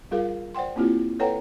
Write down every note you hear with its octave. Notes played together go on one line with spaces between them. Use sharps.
G3 F4 G#4 A#4 F5
C5 D5 F#5 G5 C6
A#3 C4 E4 F4 G4
A4 B4 C#5 F#5 G5 A#5